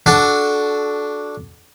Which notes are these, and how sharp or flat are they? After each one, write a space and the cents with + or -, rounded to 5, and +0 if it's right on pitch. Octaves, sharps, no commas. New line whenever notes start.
D4 +0 F#4 +0 A4 -25